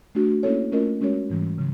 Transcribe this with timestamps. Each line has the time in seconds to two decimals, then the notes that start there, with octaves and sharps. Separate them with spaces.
0.15 A3 D4 F#4
0.43 A#3 C#4 E4 A4 C#5
0.72 A3 C#4 F4 A#4 D#5
1.01 G#3 C#4 F#4 A#4 C#5
1.29 G#2 E3 G3
1.58 C#3 F#3